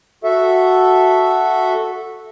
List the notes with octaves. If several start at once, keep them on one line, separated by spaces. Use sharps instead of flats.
F#4 A4 E5